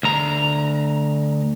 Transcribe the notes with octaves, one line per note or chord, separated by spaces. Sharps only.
D2 A#5